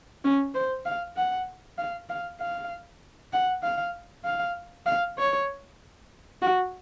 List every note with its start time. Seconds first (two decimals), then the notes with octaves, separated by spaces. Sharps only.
0.24 C#4
0.54 C5
0.85 F5
1.16 F#5
1.78 F5
2.09 F5
2.40 F5
3.33 F#5
3.63 F5
4.25 F5
4.86 F5
5.18 C#5
6.42 F#4